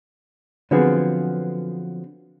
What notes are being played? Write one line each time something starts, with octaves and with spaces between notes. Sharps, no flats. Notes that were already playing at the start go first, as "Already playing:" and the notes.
D3 F3 F#3 B3 C4 G#4